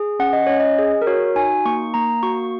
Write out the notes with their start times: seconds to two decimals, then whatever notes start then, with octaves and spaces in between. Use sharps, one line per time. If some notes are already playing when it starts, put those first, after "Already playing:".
Already playing: G#4
0.19 C#4 F#5
0.33 D#5
0.47 C#4 C#5
0.60 D#5
0.78 G#4
1.02 A#4
1.07 F#4 C#5
1.35 D#4 G#5
1.65 A#3 C#6
1.94 A#3 A#5
2.23 F#4 C#6